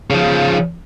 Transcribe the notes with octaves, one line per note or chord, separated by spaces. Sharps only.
C#3 F3